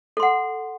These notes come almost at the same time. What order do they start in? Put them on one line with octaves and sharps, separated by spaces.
A4 C6 F#5